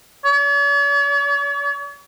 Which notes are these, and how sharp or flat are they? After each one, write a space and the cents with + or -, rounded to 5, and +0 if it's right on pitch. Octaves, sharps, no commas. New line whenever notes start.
C#5 +45